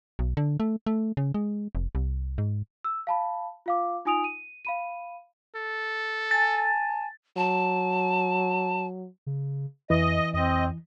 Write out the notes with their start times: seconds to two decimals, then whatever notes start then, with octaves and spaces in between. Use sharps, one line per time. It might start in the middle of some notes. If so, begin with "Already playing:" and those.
0.19 B1
0.37 D3
0.60 A3
0.87 A3
1.17 C#3
1.34 G#3
1.75 F1
1.95 C2
2.38 G#2
2.84 E6
3.07 F5 A5 B5
3.66 F4 F5 D6
4.05 D#4 F4 G#5 D#6 D7 F7
4.24 D#7
4.65 F5 B5 D#7
5.56 A4
6.31 G#5 A5 A6
7.37 F#3 A5
9.26 C#3
9.90 F2 E3 D#5
10.34 F2 C4 D#5